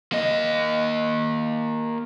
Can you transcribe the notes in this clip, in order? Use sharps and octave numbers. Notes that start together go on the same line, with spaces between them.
A#3 D#5